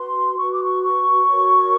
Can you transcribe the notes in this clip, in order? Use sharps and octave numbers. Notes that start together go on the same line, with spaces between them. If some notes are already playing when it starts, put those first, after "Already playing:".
Already playing: F#4 B4 C6
F#4 B4 C#6
D6
C#6
C#6
F#4 A#4 C#5